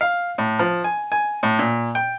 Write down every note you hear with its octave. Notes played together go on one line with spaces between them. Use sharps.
F5
A2
F3
G#5
G#5
A2
A#2
G5